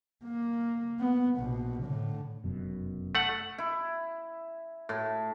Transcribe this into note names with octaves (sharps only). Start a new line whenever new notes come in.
A#3
B3
A#1 B2
A2 D3
F1 F#2 B2
A3 F#5
E4
A2